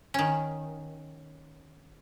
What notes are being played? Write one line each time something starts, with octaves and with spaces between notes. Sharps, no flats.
D#3 C#4